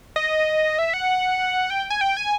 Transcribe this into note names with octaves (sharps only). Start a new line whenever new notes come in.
D#5
E5
F#5
G5
G#5
G5
G#5